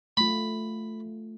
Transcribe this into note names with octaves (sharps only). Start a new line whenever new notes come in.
A3 F4 B5